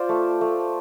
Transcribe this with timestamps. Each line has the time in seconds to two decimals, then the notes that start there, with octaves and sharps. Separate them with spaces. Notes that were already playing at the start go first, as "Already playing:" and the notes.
Already playing: F4 C5 D5
0.09 A3
0.41 A3